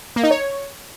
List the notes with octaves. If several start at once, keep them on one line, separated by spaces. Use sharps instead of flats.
A#3
D#4
C#5